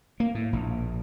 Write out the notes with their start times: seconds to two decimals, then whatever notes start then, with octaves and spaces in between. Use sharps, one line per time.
0.20 A#3
0.35 A2
0.53 A#1